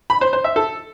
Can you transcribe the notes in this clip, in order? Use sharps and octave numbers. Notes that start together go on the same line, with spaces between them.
B5
C5
C5
E5
A4